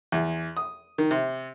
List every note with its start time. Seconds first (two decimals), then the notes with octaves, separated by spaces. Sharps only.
0.12 E2
0.57 D#6
0.98 D#3
1.11 C3